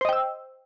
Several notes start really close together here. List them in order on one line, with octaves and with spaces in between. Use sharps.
C5 D#5 G5 E6